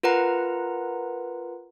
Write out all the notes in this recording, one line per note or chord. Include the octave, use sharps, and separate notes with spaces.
F4 A#4 B4 F#5 A#5